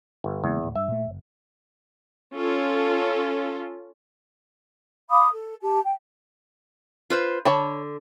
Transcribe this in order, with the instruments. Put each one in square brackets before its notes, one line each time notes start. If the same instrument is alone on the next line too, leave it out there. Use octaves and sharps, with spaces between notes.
[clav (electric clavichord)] G1
[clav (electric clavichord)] E2 [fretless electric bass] C#3 G#3 A#3
[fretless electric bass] D1 A2
[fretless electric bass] G2 [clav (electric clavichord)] E5
[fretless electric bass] A#2 A3
F#1
[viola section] C#4 F4 A4
[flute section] F5 B5 D6 D#6
A4
G4 A5
G5
[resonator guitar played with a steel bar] F4 B4 C5
[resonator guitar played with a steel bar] D3 [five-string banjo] C#5 A5 B5